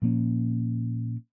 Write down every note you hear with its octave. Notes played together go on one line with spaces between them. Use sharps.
A#2 F3 A#3 C#4